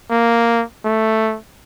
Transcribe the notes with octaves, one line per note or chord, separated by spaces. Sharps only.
A#3
A3